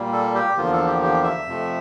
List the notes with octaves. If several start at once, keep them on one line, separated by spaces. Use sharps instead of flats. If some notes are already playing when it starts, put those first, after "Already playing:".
Already playing: A#2 G3 A#3
A4
G4
E2 D3 F3 A#3 F4
A4
G4
G4
E5
F2 C3 F3 A3